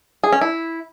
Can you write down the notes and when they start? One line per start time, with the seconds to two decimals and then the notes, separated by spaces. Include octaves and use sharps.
0.24 G#4
0.32 C#4
0.41 E4